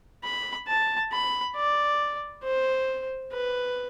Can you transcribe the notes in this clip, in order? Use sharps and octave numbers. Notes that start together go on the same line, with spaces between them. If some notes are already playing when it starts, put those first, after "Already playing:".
B5
A5
B5
D5
C5
B4